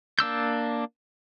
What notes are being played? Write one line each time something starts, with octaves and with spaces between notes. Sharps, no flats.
A#3 D4 E6 G6